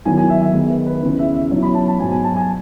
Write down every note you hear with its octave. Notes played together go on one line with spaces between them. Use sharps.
D#3 F#3 B3 E4 G#5
G#5
E5
E5
D#3 G#3 B3 D#4
B4
B4
E2 C#3 E3 B4
E5
E5
B2 F#3 C#4 E4 C#5
B5
A5
A5
G#2 F#3 B3 G#5
G#5
A5
G#5